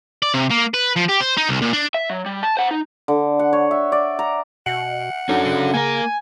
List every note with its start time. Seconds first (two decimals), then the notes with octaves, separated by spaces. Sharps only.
0.22 D5
0.34 C3
0.51 A#3
0.74 B4
0.97 F3
1.09 G4
1.21 C5
1.37 D#4
1.49 C2
1.62 A#2
1.73 D4
1.94 E5
2.10 F#3
2.26 G3
2.43 A5
2.57 C5 F#5
2.71 D#4
3.08 D3
3.39 F#5
3.53 C#5
3.71 E5
3.92 D5
4.19 A#5
4.66 B2 F#5
5.29 D3 C#4 D#4 F#4
5.46 C#3
5.74 A#3 A#4 G#5